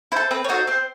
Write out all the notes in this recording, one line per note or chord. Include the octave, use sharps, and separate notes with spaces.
E4 A4 C5
C4 B4
C#5
D#4 F#4 A4 C5
C4 C5